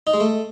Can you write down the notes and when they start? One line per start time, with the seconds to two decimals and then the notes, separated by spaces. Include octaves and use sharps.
0.07 D#4
0.14 G#3
0.20 A3